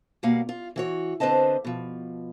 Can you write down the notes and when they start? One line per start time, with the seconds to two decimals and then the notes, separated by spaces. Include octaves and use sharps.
0.23 B2 G3 A#3 F5 F#5
0.49 F4
0.76 E3 F#4 C#5
1.20 D3 C4 B4 C5 D#5 A5
1.65 B2 F3